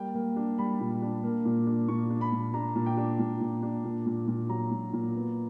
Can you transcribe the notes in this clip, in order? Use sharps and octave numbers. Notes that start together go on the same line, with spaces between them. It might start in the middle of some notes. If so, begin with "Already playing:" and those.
Already playing: G3 A#3 G5
A#3
D4
G3 B5
A#2
D4
A#3
A#2
D4
A#2 C#6
D4
B5
A#2
D4 A#5
A#2
G5
D4
A#2
A#2
D4
A#2
A#2
A#2
F#3 A#5
A#2
A#2
B3